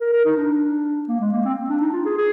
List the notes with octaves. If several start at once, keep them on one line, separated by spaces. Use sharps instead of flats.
A#4
A#4
D#4
D4
A#3
G#3
A#3
C4
D4
D#4
F4
G#4
G#4